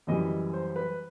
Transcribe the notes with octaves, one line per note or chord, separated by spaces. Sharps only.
F#2 E3 G3 D#5
C5
B4